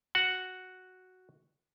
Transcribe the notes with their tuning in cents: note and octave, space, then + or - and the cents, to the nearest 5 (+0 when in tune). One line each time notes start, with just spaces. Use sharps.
F#4 +0 F#5 +0